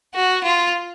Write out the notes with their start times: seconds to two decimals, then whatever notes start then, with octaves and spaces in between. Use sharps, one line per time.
0.15 F#4
0.44 F4